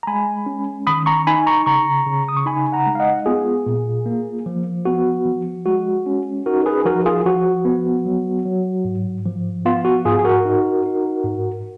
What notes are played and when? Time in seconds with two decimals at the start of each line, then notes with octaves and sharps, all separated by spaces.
0.03 A#5
0.07 G#3 G#5 B5
0.46 C#4
0.87 D#3 B5 D#6
1.06 A#5 C#6
1.27 D#4 G#5 B5
1.47 A#5 C#6
1.66 C#3 A#5 C#6
2.06 C#3
2.28 D#6
2.37 C#6
2.46 D#4 G#5 B5
2.72 F#5 A#5
2.87 G#3
2.95 F5
3.00 D#5 F#5
3.26 B3 F4 G#4
3.66 A#2
4.06 A#3
4.46 F3
4.85 B3 F#4
5.26 F3
5.66 G#3 F#4
6.06 C#4
6.46 D#4 F#4 A#4
6.66 G#4 B4
6.85 F3 F#4 A#4
7.06 F4 G#4
7.26 F3 F#4
7.65 B3
8.05 F#3
8.46 F#3
8.85 G#2
9.26 F3
9.66 B3 F4
9.85 F#4
10.05 G#2 F4 G#4
10.19 G#4
10.25 F#4 A#4
10.45 D#4
10.86 D#4
11.24 G#2